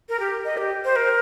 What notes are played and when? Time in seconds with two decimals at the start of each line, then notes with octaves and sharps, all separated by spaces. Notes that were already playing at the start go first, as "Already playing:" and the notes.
0.09 A#4
0.20 G4
0.45 D#5
0.57 G4
0.85 C5
0.96 A#4